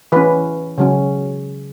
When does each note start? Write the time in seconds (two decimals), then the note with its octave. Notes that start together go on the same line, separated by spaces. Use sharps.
0.12 E3 C#4 B4
0.78 C#3 F#3 C#4